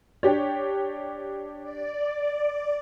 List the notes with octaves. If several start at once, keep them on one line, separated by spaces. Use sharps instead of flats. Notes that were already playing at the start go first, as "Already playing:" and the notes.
D4 G4 C#5
D5